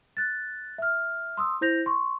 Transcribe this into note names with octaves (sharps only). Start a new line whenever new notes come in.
F#6 A6
E5 F6
C6 D#6 E6
E4 C5 G6 A#6 F7
C6 C#6